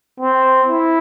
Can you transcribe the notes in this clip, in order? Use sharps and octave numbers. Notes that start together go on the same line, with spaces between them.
C4
E4